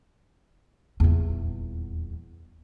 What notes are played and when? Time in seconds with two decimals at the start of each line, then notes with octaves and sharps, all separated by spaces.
1.00 D#1 E2